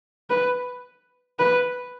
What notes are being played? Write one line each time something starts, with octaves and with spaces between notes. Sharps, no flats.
B4
B4